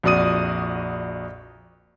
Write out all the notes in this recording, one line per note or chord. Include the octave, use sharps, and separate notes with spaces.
A#1 F2 F#4 D5 D#6 D#7